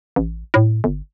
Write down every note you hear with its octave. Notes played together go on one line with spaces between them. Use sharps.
A1
A2
G1